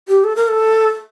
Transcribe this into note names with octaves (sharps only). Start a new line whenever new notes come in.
G4
A4
A#4
A4